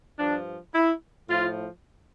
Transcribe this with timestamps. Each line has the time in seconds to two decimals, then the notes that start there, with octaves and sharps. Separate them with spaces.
0.19 G2 F3 D4
0.74 E4
1.29 A2 F3 F4